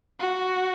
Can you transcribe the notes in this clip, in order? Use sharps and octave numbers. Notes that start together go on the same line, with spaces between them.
F#4